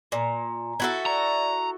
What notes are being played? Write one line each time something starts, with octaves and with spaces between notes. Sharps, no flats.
A#2 G#5 A#5
E4 F#4 A4
D5 A#5